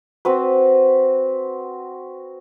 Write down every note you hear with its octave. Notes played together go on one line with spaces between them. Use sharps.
C4 F#4 B4